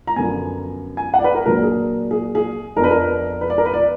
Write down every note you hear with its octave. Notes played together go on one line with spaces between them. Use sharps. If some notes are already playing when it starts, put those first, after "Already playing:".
A#5
F#2 D3 F3 B3 G#5
G#5
F#5
D5
B4
A#4
A#2 F#3 D4 A#4
G#4
G#4
G#4
F2 F3 B3 D4 A#4
B4
A#4
B4
D5
A#4
B4
D5